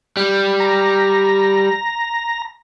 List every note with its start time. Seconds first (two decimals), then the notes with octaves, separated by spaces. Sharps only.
0.17 G3
0.60 A#5